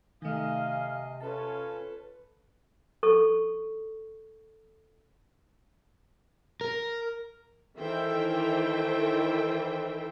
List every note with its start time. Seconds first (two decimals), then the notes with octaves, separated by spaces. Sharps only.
0.22 C3 D#3 A3 D#5 F5 G#5 F6
1.21 C#4 F4 A4 B4 A5
3.03 A4 C#6
6.61 A#4
7.77 D#3 E3 A4 C5 E5 G5